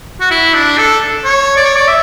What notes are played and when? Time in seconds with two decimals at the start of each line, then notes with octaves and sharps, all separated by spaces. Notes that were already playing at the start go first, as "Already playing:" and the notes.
0.21 F#4
0.31 E4
0.54 D4
0.78 A4
1.25 C#5
1.56 D5
1.65 C#5
1.76 D5
1.88 E5